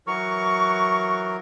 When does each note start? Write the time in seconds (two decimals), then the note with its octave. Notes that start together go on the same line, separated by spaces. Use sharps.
0.07 E3 F#3 A#4 C#6